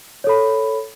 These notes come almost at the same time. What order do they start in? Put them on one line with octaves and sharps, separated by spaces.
C#5 A4 B5